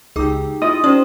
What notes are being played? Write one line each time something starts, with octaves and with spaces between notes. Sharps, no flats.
C#2 D#4 G4 G#4 D6
E4 F4 D#5 D#6
C#4 G4 C5 D5